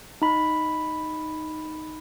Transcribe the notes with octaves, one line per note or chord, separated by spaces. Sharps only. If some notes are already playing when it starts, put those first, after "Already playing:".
D#4 B5